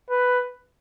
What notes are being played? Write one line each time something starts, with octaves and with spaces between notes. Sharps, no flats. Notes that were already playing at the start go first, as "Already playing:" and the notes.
B4